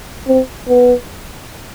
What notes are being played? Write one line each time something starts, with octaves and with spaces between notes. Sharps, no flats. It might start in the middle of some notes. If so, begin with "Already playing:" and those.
C4
B3